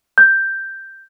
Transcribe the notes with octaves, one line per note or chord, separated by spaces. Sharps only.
G6